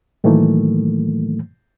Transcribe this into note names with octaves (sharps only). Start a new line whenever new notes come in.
A2 D#3 E3 F#3 A3 A#3